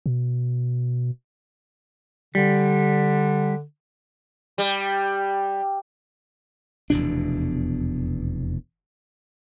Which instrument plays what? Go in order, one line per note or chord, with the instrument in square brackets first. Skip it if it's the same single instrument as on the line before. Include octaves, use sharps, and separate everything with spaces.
[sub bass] B2
[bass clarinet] D3 [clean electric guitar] G3
[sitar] G3
[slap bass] F1 E2 B2 D4